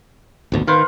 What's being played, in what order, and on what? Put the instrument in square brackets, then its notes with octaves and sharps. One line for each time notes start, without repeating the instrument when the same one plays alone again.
[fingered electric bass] G#1 D2 B2
[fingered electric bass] D#3 [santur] B4 C5 F5